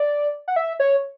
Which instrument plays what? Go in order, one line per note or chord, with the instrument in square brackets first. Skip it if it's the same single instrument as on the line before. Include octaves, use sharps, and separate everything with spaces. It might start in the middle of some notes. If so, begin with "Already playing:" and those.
Already playing: [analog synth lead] D5
F#5
E5
C#5